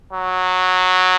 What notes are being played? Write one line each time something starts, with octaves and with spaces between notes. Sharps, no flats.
F#3